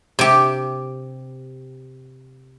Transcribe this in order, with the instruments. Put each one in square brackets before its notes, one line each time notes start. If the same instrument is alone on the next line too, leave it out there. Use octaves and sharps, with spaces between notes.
[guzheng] C3 G4